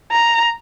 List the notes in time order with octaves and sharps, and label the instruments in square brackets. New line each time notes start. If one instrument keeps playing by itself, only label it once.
[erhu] A#5